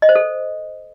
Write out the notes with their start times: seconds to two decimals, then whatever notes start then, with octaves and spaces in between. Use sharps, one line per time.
0.02 D#5
0.09 C5
0.15 A4